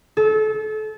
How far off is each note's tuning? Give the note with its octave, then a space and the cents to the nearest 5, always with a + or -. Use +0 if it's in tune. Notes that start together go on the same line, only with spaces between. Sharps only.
A4 -30